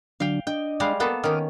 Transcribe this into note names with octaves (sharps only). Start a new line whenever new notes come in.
D3 F#3 D4 F5 G5
D4 D#5 G5
G3 G#3 F5
A#3 B3 A4
D#3 C#4 D6 D#6 F6